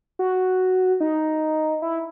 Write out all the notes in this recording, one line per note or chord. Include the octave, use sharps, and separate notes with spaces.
F#4
D#4
E4